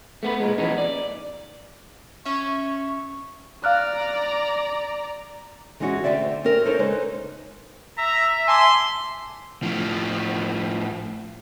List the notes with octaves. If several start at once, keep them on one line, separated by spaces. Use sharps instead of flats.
A3 B3 B4
B1 A#2 G#3
E3 F3 B3 C#4 D#4
D5
C#4 E5 C#6
D5 F5 A#5 F6 F#6
E3 G#3 C#4 D#4 F4 F#4
D2 G2 D3 C4 D5 E5
C4 C#4 A4 A#4
D#4 E4 A4 A#4 C5 C#5
C#3 G#3 D#4 B4 C5
E5 A#5
G#5 A5 C6 D6
A2 F3